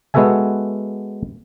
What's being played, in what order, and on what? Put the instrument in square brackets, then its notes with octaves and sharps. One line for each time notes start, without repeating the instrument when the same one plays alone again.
[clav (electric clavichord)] G#3 B3 F#4 A4 E5 G#5